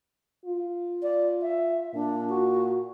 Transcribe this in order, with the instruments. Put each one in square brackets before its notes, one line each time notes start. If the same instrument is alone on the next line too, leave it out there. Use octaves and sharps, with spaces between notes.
[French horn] F4
[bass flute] D5
E5
[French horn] A#2 [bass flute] D4
[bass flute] F#4